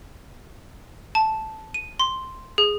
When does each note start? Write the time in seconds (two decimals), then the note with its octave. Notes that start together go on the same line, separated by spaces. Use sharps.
1.15 A5
1.74 D#7
2.00 C6
2.58 G#4